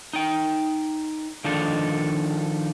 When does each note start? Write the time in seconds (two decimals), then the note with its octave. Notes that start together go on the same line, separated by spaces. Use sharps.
0.13 D#4 G5
1.44 D#3 F3 D4 D#4 A4